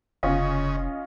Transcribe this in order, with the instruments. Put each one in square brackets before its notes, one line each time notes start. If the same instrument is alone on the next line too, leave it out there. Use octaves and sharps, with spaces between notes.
[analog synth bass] F1 [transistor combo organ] C#3 [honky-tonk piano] C#4 F4 D#5